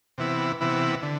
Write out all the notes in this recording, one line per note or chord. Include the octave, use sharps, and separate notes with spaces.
C3 E3 B3 E4
C3 E3 B3 E4
D3